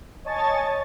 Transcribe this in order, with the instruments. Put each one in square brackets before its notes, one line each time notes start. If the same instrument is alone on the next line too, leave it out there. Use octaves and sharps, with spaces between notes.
[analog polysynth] C#5 D#5 G#5 A5 C#6 A6